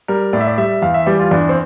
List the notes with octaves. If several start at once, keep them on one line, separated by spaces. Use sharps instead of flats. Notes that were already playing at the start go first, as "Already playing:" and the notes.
G3 A#4
A2 D5
E5
D5
G3 E5
E2 F5
E5
E3 G3 D5
F4
E2 D4
C4